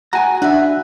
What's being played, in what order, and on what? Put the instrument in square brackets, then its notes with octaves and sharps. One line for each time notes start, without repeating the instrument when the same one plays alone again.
[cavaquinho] F#4 G#4 [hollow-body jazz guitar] G#5 A#5
[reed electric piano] D4 [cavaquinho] F#4 B4 E5